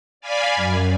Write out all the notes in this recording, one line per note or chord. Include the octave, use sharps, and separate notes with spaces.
D5 F5 G#5 B5
F#2